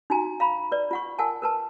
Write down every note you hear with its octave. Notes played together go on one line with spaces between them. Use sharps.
D#4 F#4 G#5 A#5
F5 A#5 B5
B4 D5
F4 F#5 C#6
A#4 F#5 G#5 A5
A#4 B4 A5